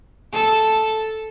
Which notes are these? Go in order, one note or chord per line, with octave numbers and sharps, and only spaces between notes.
A4